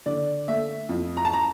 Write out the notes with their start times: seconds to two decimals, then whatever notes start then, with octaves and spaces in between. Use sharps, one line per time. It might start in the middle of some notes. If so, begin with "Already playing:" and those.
0.06 D3 D5
0.48 A3 E5
0.89 F2
1.17 A#5
1.25 A5
1.33 A#5